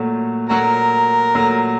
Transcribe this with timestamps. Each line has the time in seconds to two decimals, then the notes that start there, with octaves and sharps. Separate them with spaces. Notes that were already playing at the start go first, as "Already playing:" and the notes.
Already playing: A#2 F#3 A3
0.50 A#2 F#3 A3 F#4 A#4
1.34 A#2 F#3 A3